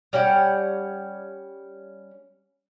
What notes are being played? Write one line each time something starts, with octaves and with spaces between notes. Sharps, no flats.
G3 C#4 F#5 G5